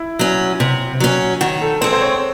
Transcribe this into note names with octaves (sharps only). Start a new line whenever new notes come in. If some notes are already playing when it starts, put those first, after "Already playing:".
Already playing: E4
F#3 C#4
C3
F#3 C#4
D#3 F#4
A4
G#3 C4 C5
C5
C#5